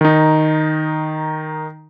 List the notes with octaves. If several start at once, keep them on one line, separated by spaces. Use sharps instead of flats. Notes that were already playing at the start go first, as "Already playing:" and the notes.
D#3 D#4